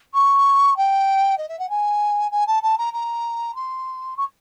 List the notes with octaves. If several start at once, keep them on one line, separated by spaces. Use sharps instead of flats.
C#6
G5
D#5
E5
F#5
G#5
G#5
A5
A5
A#5
A#5
C6
C#6